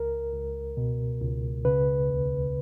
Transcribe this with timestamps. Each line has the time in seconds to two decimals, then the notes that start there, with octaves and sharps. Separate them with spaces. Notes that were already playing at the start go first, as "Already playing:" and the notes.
Already playing: C#2 A#4
0.34 C#2
0.77 B2
1.21 C#2
1.65 C#3 B4
2.09 D#2